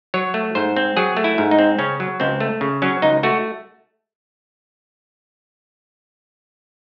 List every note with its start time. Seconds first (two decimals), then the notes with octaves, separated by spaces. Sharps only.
0.14 F#3 C#5
0.34 A3
0.55 G#2 C5
0.76 C4
0.97 F#3 G#4
1.17 A3
1.24 E4
1.38 G#2
1.51 D#4
1.59 C4
1.79 C#3 C#4
2.00 F#3
2.20 C#2 C4
2.40 A3
2.61 C#3
2.82 F#3 C#4
3.02 C#2 D#4
3.23 A3 F#4